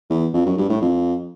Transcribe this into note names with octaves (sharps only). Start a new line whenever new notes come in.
E2
F2
F#2
G2
A2
F2